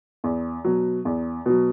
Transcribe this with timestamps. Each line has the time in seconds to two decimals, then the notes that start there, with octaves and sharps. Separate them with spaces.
0.24 E2
0.64 B2 F#3
1.05 E2
1.46 B2 F#3